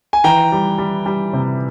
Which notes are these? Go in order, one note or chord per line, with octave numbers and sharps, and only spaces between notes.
G#5
E3 G5 A#5
G3
G3
G3
C3